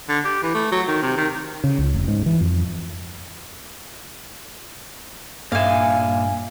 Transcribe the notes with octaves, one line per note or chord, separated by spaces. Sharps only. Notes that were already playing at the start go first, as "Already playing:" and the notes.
D3
G4
E3
A3
F#3
D#3
C3
D#3
C#3
C#2
F1
G#2
E3
F2
G2 A#2 E5 F5 G#5